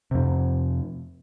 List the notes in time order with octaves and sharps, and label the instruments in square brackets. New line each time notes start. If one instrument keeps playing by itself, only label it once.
[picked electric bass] F2 C3